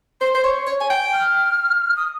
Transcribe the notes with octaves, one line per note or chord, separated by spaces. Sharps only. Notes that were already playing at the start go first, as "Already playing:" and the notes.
C5 C6
C5
C#5 C#6
C#5
G#5
G5
F6
D#6